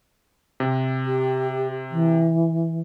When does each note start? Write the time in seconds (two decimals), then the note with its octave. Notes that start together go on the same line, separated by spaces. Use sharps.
0.60 C3
1.06 G4
1.90 E3